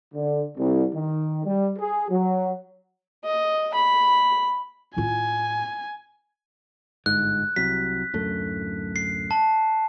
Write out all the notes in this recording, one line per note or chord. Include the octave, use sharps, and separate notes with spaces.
D3
C2
D#3
G3
G#4
F#3
D#5
B5
A2 F4 G#5
G1 G#2 F#6
C2 C3 F#3 B6
D1 F#2 A3
C7
A5